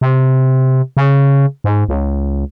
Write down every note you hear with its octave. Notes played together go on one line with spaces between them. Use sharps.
C3
C#3
G#2
C#2